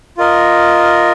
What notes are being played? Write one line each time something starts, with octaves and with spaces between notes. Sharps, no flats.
F4 A#4 D#5